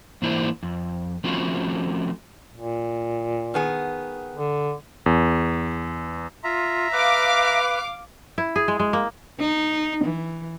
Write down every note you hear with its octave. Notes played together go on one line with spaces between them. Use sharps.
G#2 E3 A#3 D4 E4 C5
F2
F3 A3 C4 C#4 F4 F#4
A#2
D#3 B3 G#4
D3
E2
F4 E5 A#5
B4 F5 D6
E4
G#4
G#3
G#3
A#3
D#4
E3